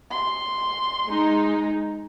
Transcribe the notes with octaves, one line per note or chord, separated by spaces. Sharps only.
C6
G#3 D#4